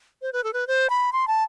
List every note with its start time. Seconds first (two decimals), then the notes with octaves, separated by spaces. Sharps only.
0.22 C5
0.33 B4
0.44 A4
0.53 B4
0.67 C5
0.90 B5
1.13 C6
1.28 A5